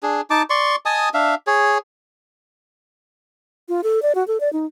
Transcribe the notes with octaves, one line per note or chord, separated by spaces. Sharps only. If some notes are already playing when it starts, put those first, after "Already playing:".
D4 G#4
D#4 A5 D6
D5 C6 C#6
D#5 G#5 A5 D#6
D4 E5 F5
G#4 C#5
F4
A4
D5
F#4
A4
D5
D#4